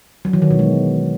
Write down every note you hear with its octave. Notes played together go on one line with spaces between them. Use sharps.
F#3
E3
D#3
B2
G#3